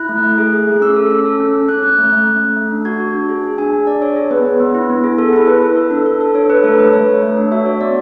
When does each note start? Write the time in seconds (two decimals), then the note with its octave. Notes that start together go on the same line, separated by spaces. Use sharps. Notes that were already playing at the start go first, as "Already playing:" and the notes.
Already playing: E4 F#6
0.09 A3
0.24 A3
0.38 G#4
0.53 G#4
0.67 A3
0.81 C#4 E6
0.96 A4
1.11 C#4 E6
1.25 A4
1.40 C#4
1.55 C#4
1.69 C#4 F#6
1.83 C#4 F#6
1.98 A3
2.12 A3
2.27 A3
2.41 A3
2.56 A3
2.71 D4
2.85 F#4 G#6
3.00 F#4
3.14 D4
3.29 G#4
3.44 G#4
3.58 D4 G#5
3.73 D4
3.87 D4 D5
4.02 D4 C#5
4.16 G#4
4.31 B3 B4
4.46 B3
4.60 B3
4.75 E4
4.90 B3
5.04 G#4
5.18 B3 A4
5.33 E4 A4
5.47 A4 B4
5.62 A4
5.77 A4
5.91 D4
6.06 A4
6.21 A4
6.35 D4 C#5
6.50 D4 B4
6.63 A3 A4
6.78 A3 B4
6.93 A3 C#5
7.08 A3
7.22 A3
7.37 D4
7.51 F#4 E5
7.66 F#4 C#5
7.81 B3 D5